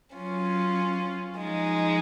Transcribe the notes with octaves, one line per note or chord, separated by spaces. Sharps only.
F#3 C#4 F4
F3 G#3 D#4